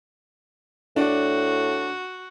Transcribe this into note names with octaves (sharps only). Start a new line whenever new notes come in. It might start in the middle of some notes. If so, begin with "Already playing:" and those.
A2 D4 F#4